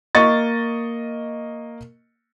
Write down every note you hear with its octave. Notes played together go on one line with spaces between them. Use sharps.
A#3 D#5 C#6 A6